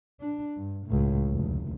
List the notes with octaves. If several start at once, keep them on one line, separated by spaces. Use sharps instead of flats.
D4
G2
C#2 A2
F1 D2